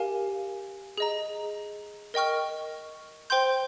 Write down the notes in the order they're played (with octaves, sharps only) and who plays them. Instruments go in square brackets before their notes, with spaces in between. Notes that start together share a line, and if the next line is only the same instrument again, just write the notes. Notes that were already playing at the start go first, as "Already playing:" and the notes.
Already playing: [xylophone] G4 A#4 F5 G#5
G#4 D#5 A#5
A#4 D#5 G5 C#6 F6
C5 G5 C6 G6